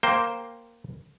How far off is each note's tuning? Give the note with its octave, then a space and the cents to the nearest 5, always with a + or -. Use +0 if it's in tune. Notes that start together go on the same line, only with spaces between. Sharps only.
A#3 +0 C5 +0 G5 +0